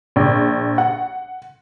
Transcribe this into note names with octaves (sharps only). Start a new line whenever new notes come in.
A#1
F#5